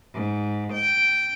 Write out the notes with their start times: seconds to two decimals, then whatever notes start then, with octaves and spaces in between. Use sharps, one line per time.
0.14 G#2
0.72 G5